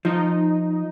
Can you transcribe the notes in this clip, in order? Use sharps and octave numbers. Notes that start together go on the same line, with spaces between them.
F3 D#4